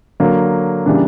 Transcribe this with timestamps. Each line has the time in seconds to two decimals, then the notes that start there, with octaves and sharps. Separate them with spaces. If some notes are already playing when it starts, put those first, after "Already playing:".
0.20 D3 F#3 A#3
0.86 C#3 E3 G3 A#3 D4